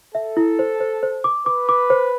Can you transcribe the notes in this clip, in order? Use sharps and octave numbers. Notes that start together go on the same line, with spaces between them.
A4 E5
E4
C5
C5
C5
D6
B4 D6
D6
C5